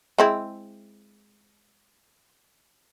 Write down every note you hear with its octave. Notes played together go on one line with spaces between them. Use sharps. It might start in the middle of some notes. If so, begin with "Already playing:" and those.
G#3 C4 E4